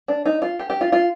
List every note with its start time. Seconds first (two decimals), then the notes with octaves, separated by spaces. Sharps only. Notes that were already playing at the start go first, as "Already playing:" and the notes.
0.08 D4
0.26 D#4
0.42 F4
0.59 G4
0.70 G4
0.81 F4
0.92 F4